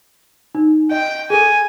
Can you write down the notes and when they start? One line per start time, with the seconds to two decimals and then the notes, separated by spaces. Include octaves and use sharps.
0.55 D#4
0.91 D#5 G5
1.30 G#4 A4 G#5